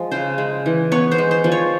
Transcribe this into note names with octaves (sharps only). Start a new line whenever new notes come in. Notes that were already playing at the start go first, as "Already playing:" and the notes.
Already playing: F3 G#3
C#3 C5
G#3
E3
B3 C#5
C5
G#3
C5
F3
C#5